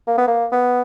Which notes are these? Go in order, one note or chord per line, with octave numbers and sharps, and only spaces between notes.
A#3
B3
A#3
B3